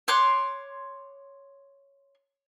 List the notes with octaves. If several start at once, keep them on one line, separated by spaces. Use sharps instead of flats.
C#5 C6 D6 F#6